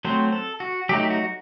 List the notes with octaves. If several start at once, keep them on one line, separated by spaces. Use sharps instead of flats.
F#3 A3 C4 C5
A4
F#4
F#3 A3 D#4 G4
F#4